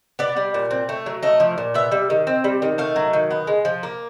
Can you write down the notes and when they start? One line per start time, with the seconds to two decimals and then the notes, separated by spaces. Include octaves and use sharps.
0.19 B3 D5
0.37 G3
0.54 A#2
0.71 C4
0.89 A3
1.06 F#3
1.23 A3 D#5
1.40 F3
1.58 A#2
1.74 B3 E5
1.92 G3
2.10 D#3
2.27 C4
2.44 G3
2.62 D#3
2.78 A3 F5
2.96 F#3
3.13 D#3
3.31 B3
3.47 G#3
3.65 F3
3.83 A#3